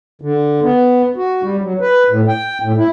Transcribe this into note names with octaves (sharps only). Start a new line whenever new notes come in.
D3
B3
F#4
G3
F#3
B4
A2
G5
A2
E4